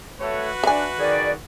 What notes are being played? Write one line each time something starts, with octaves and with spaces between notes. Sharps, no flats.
A3 F#4 B4 C#5
D4 E5 G#5
D#3 G#4 D5